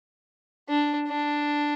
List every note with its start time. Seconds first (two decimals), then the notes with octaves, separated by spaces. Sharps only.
0.69 D4
1.08 D4